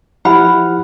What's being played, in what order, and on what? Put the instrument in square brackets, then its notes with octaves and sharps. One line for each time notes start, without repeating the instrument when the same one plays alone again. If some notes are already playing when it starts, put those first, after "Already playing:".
[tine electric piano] F3 E5 F6 [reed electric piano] E4 G4 [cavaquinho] F#5 [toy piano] B5